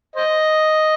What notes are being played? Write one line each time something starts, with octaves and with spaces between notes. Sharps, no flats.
C5 D#5